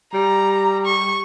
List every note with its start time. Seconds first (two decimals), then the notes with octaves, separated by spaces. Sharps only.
0.14 G3 A#5
0.86 C#6